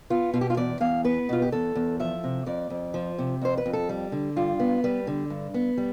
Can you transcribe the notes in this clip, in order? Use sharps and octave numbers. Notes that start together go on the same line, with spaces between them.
B3 F4
B2 F4
G4
F4
E2 D5
E2 F5
B3 B4
B2 F4
G4
E2 A4
E2
F3 E5
C3
F2 D5
F2
F3
C3
F2 C5
B4
F2
A4
G3
D3
G2 F4
B3
G3 B4
D3
G2
B3
G3